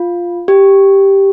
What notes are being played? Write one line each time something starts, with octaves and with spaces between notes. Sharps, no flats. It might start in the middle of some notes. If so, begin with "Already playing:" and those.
Already playing: F4
G4